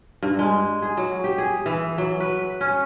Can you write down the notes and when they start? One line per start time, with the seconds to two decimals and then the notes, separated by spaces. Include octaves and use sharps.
0.23 G2
0.39 G#3
0.82 G#4
0.97 F#3
1.24 G4
1.38 G#4
1.66 E3
1.98 F#3
2.20 B4
2.61 C#4